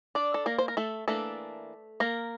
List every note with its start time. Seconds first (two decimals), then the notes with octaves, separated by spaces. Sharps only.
0.15 D4 D5
0.34 A4
0.46 A#3 A#4
0.58 C5
0.68 A#4
0.77 A3 A4
1.08 E3 A3 A#3 D4 A4
2.00 A#3 A#4